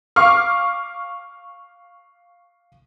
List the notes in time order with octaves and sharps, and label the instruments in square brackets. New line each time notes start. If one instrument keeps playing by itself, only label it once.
[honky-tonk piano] F5 C#6 D6 F6